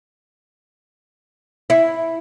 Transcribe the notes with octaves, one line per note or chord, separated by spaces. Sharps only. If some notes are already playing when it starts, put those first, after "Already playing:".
E4